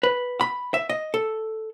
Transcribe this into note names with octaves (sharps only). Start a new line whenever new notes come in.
B4
B5
E5
D#5
A4